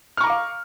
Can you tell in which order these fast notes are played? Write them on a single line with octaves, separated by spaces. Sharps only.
F6 C#6 A#5 D6 F5